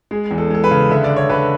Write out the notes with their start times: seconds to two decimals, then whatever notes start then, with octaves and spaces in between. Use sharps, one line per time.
0.11 G#3 G#4
0.31 E2
0.38 A4
0.50 G#3 A4
0.64 B4
0.71 C#3
0.90 D3 E5
1.04 D5
1.10 D3
1.16 C#5
1.29 D3 B4